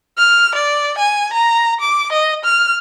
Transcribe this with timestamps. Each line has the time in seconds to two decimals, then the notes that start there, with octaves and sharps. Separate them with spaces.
0.18 F6
0.55 D5
0.98 G#5
1.33 A#5
1.81 D6
2.12 D#5
2.45 F6